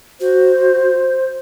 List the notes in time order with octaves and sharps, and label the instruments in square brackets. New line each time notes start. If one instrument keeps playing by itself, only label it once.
[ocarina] F#4 [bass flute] C5